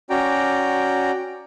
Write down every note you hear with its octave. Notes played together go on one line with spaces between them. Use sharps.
C#4 F#4 D5 G5 A#5